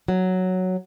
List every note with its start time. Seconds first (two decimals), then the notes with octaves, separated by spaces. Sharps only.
0.08 F#3